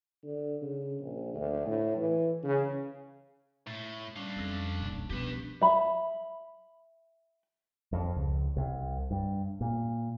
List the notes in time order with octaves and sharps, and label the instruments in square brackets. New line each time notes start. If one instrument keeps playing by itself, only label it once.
[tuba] D3
C#3
A#1
D2
A2
E3
C#3
[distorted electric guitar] A2 [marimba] A6
[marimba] G3 C#4 [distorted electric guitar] D4 F5
[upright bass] F2 [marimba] C4 E6 A#6
[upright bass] D#1 B1
[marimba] B2 F3 B3 [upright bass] D4 [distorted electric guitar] G4 B4
[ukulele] E5 B5
[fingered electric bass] F2
C#2
C2
G2
A#2